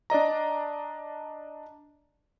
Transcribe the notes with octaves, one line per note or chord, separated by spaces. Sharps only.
D4 D5 D#5 A#5